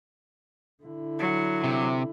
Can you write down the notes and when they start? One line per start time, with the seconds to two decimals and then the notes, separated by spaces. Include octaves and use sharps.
0.83 D3 E4
1.19 F#3
1.64 C3